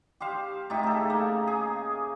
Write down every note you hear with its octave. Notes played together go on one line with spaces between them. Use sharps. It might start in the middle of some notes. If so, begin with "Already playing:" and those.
G4 C5 F5
A2 D#4 G4
C#3 A4
A#3
G#4